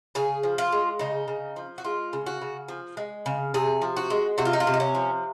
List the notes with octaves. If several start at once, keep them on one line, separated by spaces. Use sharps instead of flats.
C#3 G#4
F3
F4
G#3
C#3 D#4
C#3
F3
F#4
G#3 F4
C#3
F#4
C#3
F3
G#3
C#3
C3 G#4
F3
F#4
G#3
C3 F#4
F4
D#4
F4
C3
D#4
C#4
F3